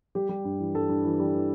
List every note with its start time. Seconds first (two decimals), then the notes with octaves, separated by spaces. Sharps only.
0.15 G3 G4
0.29 G3
0.44 G2
0.60 E3
0.74 G2 A4
0.89 G2
1.05 E3
1.20 G3
1.34 E3